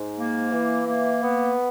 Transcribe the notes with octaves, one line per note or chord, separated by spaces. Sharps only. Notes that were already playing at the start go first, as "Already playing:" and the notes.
Already playing: G#2
A#3
E3
A#3
B3